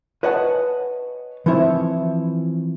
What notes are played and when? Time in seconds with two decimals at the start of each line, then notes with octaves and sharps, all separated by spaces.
0.23 B4 C#5 D#5 F#5 G#5 A5
1.46 E3 F3 C4 E4 C#5